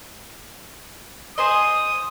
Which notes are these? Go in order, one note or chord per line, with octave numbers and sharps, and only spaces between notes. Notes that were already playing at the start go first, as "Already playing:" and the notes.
G#4 C5 D#5 D#6